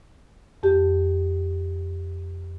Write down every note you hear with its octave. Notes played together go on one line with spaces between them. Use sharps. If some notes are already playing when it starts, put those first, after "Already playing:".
F2 G4